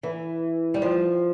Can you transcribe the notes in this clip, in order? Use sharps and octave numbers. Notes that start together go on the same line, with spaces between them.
E3
G3
F3